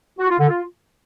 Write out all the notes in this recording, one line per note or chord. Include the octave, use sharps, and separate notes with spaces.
F#4
F4
D3
F4